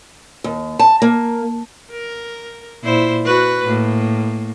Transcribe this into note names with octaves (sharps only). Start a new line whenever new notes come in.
D#2
A5
A#3
A#4
A#2 E4 C5
F#4 B4
A2 A#3